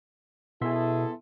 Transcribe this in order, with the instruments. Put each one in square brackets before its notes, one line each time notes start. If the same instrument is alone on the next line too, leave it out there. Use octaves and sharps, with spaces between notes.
[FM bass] B2 [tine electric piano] B3 E5 C6 [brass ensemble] E4 G#4 A4